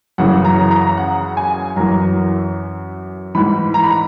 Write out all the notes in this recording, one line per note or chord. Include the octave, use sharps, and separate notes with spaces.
F#2 C#3 E3 F#5
A#5
A#5
F#5
G#5
F#2 E3 A#5
G#2 E3 B5
A#5
B5